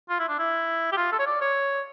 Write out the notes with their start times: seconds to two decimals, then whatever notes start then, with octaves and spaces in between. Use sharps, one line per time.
0.09 F4
0.19 E4
0.29 D4
0.39 E4
0.92 G4
0.97 F4
1.12 A4
1.19 C#5
1.26 D5
1.41 C#5